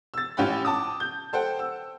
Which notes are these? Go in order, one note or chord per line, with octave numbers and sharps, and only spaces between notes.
E6 A6
A1 C#4 F4 G4 F#5 B5
A5 D6 D#6
G6
A4 C5 F#5 G5
E6